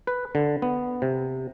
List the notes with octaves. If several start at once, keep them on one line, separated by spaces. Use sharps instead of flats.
B4
D3
B3
C3